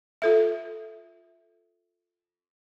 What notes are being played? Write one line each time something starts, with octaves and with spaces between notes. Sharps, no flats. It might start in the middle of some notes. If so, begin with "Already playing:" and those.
F4 A4 E5